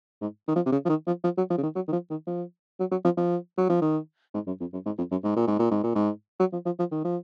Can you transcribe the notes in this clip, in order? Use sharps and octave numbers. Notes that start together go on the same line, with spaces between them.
G#2
D#3
F3
C3
C#3
F3
D#3
F3
F3
F#3
F3
C#3
D#3
F#3
D#3
F3
D#3
F3
F#3
F#3
F3
F3
F#3
F3
D#3
G#2
F#2
F2
F#2
G#2
F2
F#2
G#2
A#2
G#2
A#2
G#2
A#2
G#2
F#3
F3
F3
F3
D#3
F3